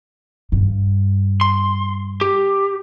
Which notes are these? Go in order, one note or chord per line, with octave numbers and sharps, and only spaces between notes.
G2
C6
G4